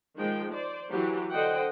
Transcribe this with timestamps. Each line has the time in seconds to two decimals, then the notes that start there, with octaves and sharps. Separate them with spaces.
0.17 D#3 F3 G#3 G5
0.53 C5 D5
0.89 E3 F#3 G4
1.31 D3 C5 D#5 F#5 G5